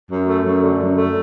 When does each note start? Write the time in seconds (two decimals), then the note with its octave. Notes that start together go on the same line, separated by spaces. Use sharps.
0.09 F#2
0.26 A3
0.44 F#2
0.62 D3
0.79 F#2
0.97 A3